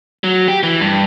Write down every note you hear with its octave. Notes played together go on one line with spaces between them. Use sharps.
F#3
G4
E3
G2